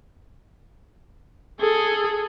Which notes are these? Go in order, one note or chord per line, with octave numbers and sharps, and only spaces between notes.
G#4 A4